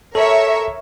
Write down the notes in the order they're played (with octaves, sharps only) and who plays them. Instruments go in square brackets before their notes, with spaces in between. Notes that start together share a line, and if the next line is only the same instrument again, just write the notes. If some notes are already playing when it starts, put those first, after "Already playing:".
[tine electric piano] A4 [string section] A#4 C#5 E5